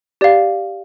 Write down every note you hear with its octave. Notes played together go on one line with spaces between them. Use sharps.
G4 D5 F5